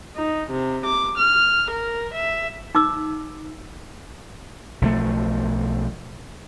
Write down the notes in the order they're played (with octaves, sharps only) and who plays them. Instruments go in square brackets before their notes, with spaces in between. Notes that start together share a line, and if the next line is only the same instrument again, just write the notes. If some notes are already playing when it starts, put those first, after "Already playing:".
[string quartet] D#4
C3
D6
F6
A#4
E5
[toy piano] D#4 D6 E6
[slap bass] B1 F3 A3